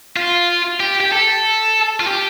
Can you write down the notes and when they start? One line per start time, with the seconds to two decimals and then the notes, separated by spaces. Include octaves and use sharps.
0.16 F4
0.80 G4
1.00 G4
1.12 A4
2.00 F4
2.07 G4